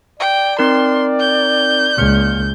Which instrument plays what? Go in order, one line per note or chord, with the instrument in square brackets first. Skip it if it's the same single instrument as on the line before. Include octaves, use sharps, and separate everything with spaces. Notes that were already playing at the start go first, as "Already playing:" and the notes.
[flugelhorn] D5 [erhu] G5
[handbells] C4 D#4 A#4 [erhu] C6
[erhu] G6
[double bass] C#2 [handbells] A#3 F6 C#7